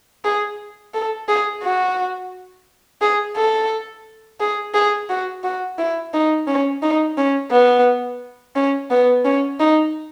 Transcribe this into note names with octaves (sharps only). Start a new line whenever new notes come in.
G#4
A4
G#4
F#4
G#4
A4
G#4
G#4
F#4
F#4
E4
D#4
C#4
D#4
C#4
B3
C#4
B3
C#4
D#4